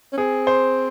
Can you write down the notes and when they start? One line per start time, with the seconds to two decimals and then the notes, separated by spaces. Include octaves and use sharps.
0.13 C#4
0.18 C4 G#4
0.47 C5